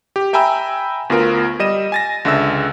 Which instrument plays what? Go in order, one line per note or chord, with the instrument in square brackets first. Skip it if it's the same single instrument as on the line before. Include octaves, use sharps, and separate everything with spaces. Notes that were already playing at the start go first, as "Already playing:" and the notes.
[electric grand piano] G4
E5 G5 G#5 A#5 B5 E6
D2 B3 F4 A#4 D7
G3 D#5 D#7 E7
G#5 A6 A#6
C#2 D3 G#3 E5 E6